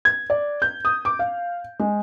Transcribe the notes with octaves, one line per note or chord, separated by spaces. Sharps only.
G#6
D5
G6
D#6
D6
F5
G#3